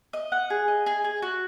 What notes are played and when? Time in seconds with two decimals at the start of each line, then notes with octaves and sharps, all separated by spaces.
0.13 D#5
0.32 F#5
0.50 G#4
0.68 D#5
0.86 G#4
1.04 G#4
1.22 F#4